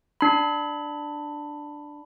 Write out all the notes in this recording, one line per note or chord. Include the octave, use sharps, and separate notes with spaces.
D4 B5